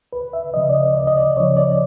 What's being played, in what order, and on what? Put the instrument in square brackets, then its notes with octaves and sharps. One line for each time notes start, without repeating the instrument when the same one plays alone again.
[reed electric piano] D2 B4
E5
C#3 F3 D#5
D5
D#5
D2 D5
D#5
D5
C#3 F3 C#5
D5